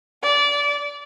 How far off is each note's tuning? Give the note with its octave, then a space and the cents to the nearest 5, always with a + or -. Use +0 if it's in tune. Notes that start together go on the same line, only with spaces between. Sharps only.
D5 -20